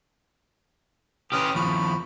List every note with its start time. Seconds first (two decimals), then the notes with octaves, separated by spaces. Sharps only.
1.32 C#4 G4 B4 D#6 F6
1.55 D#2 F3 B5 C#6